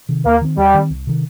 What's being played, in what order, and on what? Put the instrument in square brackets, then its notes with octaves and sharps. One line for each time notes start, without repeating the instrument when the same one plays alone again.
[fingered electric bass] C3 D#3
[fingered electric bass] D#2 [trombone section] A#3
[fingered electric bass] D#3 C4
[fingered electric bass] D#2 [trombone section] G3
[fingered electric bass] D#3 C4
C2
C3 D#3